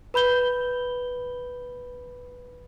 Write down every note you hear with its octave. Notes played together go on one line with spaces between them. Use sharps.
B4 B5 G6 G7